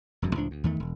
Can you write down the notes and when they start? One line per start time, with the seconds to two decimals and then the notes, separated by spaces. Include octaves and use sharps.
0.22 E1 F#2 B2
0.35 C#2 A2 F3 D4
0.51 D2
0.64 E2 D#3 A3
0.80 E1